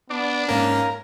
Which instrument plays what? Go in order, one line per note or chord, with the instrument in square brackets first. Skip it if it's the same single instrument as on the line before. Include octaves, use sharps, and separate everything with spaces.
[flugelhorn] B3 [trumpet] D4 [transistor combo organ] D5
[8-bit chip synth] G#2 A#3 C#4 [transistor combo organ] A#4 [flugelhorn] F5